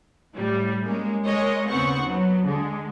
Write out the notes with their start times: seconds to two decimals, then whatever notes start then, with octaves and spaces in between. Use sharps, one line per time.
0.34 A2 G3
0.84 G#3 A#3 C#4
1.25 G#3 A#4 C#5 D#5
1.69 D#2 C#3 B3 C4 F#5 C#6
2.06 F#3 B3
2.46 D3 G#3